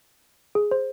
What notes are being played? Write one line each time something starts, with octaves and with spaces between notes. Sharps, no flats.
G#4
C5